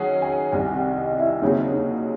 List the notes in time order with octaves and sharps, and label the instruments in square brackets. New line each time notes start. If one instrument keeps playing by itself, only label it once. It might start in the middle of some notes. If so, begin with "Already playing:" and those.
Already playing: [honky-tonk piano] D#3 F#3 C#4 G#4 [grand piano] F#5
[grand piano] G#5
[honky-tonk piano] C2 C3 D#3 [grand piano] G#5
[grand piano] F#5
D#5
E4
[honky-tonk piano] D#2 C#3 F#3 C4 F#4 [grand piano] D#4
[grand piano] D#4